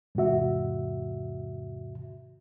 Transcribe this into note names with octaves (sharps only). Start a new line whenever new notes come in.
E2 G#2 C3 F#4 E5